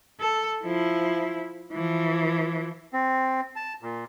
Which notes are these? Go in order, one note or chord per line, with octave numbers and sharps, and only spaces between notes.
A4
F3 E4
E3 F3
C4
A5
A#2